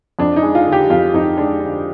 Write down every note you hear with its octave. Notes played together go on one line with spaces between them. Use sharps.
F2 D4
D#4
G#3
F4
D3
G4
F2 F4
F2 D#4
G#3 D4
D3